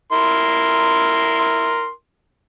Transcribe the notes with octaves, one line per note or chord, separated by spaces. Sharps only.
E4 A#4 C6